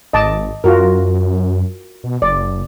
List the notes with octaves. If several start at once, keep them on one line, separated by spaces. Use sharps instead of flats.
G#1 D#5 A5 D6
F#2 F4 F#4 A#4
B2
F#1 D5